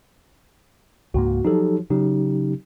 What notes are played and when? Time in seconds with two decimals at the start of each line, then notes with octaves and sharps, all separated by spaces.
1.14 C#2 G#2 A#3 F#4
1.45 F3 F#3 D#4 G4 A4
1.90 C#3 F#3 D#4 G4